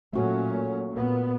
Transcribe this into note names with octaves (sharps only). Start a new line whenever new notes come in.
A#2 F#3 A3 C#4 F#4
A#2 B3